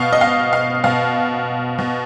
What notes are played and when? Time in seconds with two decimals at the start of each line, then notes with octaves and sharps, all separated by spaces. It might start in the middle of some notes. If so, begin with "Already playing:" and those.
Already playing: B2 F5
0.13 D#5
0.21 F5
0.53 F5
0.84 B2 F5
1.79 B2